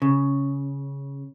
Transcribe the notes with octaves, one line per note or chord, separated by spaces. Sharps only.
C#3